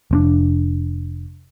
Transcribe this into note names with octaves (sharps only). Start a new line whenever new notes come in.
F1 C4 D4